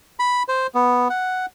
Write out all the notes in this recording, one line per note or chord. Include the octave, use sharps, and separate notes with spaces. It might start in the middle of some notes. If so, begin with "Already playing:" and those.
B5
C5
B3
F#5